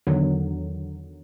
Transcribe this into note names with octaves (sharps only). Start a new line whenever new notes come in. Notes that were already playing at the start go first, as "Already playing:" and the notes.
E2 D3 D#3 F#3